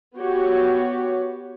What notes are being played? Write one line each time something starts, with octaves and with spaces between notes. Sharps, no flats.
B3 F#4 G4 C#5